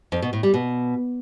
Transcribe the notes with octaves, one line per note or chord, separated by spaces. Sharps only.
F2
B2
A2
G3
B2